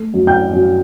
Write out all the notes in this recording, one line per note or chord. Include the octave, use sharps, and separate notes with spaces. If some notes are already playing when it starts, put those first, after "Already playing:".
Already playing: A3
F#2
G5 G6
F#2